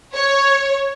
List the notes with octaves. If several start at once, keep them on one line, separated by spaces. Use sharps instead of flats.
C#5